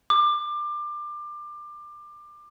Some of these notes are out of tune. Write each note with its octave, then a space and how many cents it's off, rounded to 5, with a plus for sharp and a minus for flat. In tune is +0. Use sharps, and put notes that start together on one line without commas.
D6 +25